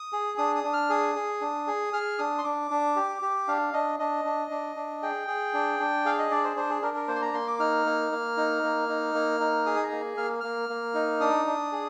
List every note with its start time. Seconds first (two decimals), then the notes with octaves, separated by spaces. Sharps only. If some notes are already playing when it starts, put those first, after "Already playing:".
Already playing: D#6
0.13 G#4
0.38 D4 D#6
0.55 D#6
0.64 D4
0.73 F6
0.89 G#4 D#6
1.15 G#4
1.41 D4
1.67 G#4
1.93 G#4 F6
2.18 D4 D#6
2.38 C6
2.44 D4 D6
2.71 D4
2.96 G4
3.22 G4
3.48 D4 F5
3.73 D4 D#5
3.99 D4 D#5
4.25 D4
4.51 D4
4.76 D4
5.03 G#4 G5
5.28 G#4
5.54 D4
5.80 D4
6.05 G#4 F5
6.19 D#5
6.31 D4 D5
6.44 C5
6.56 D4 C5
6.70 G#4
6.82 D4 A#4
6.96 A#4
7.08 A#3 C5
7.16 C6
7.22 A#5
7.34 A#3 C6
7.47 D6
7.59 D#4 F6
7.86 A#3
8.12 A#3
8.37 D#4
8.63 A#3
8.89 D#4
9.15 A#3
9.40 D#4
9.66 G#4 D#6
9.76 G#5
9.83 A#5
9.92 A#3
10.17 A#3 F6
10.41 A#3 F6
10.69 A#3
10.94 D#4
11.20 D4 D#6
11.46 D4
11.72 G#4